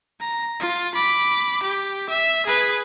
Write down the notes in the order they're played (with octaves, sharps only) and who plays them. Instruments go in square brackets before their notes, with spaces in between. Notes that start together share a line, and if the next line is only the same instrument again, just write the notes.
[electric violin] A#5
F4
B5 D6
G4
E5
G#4 B4